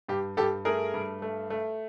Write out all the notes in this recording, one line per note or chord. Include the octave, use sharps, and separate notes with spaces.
G2 G4
G2 G4 A4
A3 G#4 A#4
G2
A3
A3